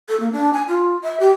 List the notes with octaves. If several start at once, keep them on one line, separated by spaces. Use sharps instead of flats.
A4
A#3
D4
G#5
F4
E5
G4